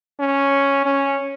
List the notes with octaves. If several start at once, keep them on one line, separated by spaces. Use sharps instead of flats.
C#4
C#4